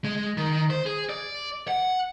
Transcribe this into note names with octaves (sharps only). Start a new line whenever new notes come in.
G#3
D#3
C5
G#4
D5
F#5